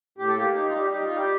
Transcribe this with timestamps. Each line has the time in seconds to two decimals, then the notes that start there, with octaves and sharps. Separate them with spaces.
0.18 A2 G4
0.28 A4
0.36 A#3 G4
0.55 D#4 G4
0.69 F4
0.73 G3 G4
0.92 D#4 G4
1.04 F4
1.11 G3
1.16 G4